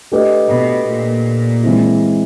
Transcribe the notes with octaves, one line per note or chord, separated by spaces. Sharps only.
A3 D4 G4 B4 D#5
B2
A#2
E3 G#3 C4 E4